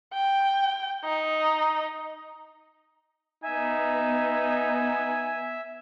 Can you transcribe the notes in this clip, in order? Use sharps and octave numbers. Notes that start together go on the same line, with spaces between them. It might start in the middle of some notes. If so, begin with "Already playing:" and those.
G5
D#4
B3 D#4 E5 G#5